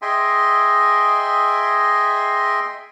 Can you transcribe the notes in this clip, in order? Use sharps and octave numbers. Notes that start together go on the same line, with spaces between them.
G#4 D#5 E5 G5 G#5 C6